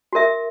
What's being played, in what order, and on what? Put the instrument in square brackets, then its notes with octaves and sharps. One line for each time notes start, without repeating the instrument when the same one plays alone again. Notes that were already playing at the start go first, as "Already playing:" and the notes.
[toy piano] F#4 A#4 E5